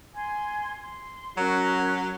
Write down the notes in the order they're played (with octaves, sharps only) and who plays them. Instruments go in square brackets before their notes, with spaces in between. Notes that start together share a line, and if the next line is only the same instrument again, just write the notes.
[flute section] G#5 C6
C6
[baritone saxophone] F#3 [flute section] C#4 F#4 A#4